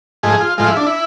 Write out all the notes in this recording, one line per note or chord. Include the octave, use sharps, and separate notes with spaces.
G#2 F3 A3 G#4
F4
A2 F3 G#3 F4
E4
D4
E4